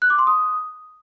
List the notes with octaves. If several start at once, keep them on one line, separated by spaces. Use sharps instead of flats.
F#6
D6
C6
D#6